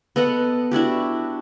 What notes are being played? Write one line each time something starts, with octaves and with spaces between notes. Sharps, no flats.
B3 A4 D#5 F#5
D4 E4 F#4 G4